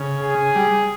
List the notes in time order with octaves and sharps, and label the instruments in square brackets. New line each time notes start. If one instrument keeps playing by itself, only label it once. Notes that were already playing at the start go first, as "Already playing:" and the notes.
Already playing: [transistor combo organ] C#3
[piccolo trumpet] G#4
[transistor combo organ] G3